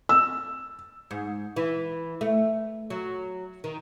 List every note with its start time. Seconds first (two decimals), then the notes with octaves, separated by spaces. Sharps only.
0.09 E6
1.11 G#2
1.56 E3
2.21 A3
2.90 F#3
3.64 D#3